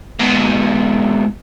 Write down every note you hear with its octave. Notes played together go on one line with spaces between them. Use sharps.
G#2 B2